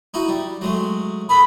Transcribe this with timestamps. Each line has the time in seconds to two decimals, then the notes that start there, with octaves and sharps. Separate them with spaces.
0.14 D#4 E4 F#4
0.28 G3
0.61 F#3 G#3 A3
1.29 G#4 A4 B5